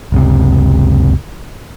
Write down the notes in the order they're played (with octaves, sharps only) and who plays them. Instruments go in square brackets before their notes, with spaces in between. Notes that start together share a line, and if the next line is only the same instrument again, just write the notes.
[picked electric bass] F#1 C#2 C3